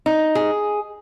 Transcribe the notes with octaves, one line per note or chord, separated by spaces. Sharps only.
D#4
G#4